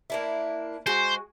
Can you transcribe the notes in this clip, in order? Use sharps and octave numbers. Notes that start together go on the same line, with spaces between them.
A#3 D4 E4
G#3 F#4 C5 G#5